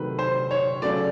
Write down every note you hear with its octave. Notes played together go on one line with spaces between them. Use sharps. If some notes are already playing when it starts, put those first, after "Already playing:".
Already playing: C3 D#3 F#3 A3 B4
C5
C#5
C#3 F#3 A3 D5